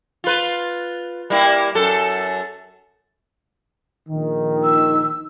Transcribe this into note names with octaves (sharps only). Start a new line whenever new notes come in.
F4 B4
G3 A#3 E4
F#2 A4
A#1 D#3
E6